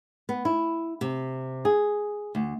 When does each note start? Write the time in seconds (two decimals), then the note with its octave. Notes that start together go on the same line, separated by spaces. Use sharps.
0.29 B3
0.45 E4
1.01 C3
1.65 G#4
2.35 D2